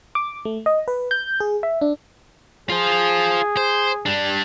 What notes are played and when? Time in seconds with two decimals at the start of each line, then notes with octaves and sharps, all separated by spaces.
0.15 D6
0.45 A3
0.66 D#5
0.88 B4
1.11 G6
1.40 G#4
1.63 E5
1.81 D4
2.70 F4 G#4 C5
3.57 C5
4.06 G3 D4